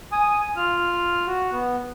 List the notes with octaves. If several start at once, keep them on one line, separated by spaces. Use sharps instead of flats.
G#5 D#6
F4 F6
F#4
B3